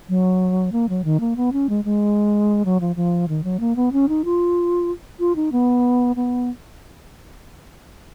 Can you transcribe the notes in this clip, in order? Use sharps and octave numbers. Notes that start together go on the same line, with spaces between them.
F#3
A#3
F#3
D#3
A#3
B3
C#4
G#3
G#3
F#3
F3
F3
D#3
F#3
A#3
B3
C#4
D#4
F4
F4
D#4
B3
B3